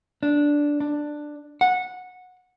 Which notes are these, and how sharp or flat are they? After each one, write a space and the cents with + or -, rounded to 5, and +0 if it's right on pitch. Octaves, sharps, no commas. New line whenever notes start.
D4 -5
D4 +10
F#5 -15